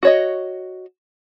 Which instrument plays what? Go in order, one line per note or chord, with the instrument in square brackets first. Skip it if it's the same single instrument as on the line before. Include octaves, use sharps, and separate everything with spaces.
[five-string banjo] F#4 C#5 D#5